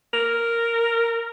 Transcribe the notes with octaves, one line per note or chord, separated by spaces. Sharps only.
A#4